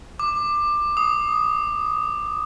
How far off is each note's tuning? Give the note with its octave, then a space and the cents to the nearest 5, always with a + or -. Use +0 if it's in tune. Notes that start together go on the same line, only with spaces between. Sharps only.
D6 +20
D#6 +0